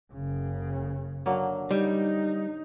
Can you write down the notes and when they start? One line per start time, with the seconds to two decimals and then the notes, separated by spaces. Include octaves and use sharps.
0.13 F#1 C#3
1.26 D3 F#3 A#3
1.71 G3 D#4